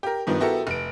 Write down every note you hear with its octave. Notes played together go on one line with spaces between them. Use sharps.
G4 A#4
G2 D#3 F3 B3
B3 E4 F#4 G4 A4 A#4
F1 D7